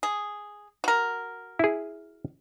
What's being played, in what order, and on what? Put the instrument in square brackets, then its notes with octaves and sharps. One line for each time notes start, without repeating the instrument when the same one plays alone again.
[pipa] G#4
F#4 A#4
[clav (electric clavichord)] E4 G#4